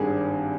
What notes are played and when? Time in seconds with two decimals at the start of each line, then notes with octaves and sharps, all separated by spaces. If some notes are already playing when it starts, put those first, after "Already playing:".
Already playing: G#1 G2 D#3 G#4